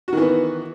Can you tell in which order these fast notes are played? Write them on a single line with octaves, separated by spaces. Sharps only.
F#4 D#3 E3 B3